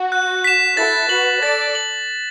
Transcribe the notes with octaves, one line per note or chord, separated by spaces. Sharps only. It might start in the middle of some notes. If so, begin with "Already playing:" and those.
Already playing: F#4
F#6
B6 E7
E4 A4 A6
F#4 B4 F#7
A4 D5 A6
F#7